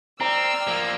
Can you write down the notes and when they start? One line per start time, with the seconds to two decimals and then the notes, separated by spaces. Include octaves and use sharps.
0.20 C4 D5 A#5 E6 F6
0.67 F3 A#3